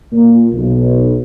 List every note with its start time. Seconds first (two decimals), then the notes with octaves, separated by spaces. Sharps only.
0.12 A#2
0.52 B1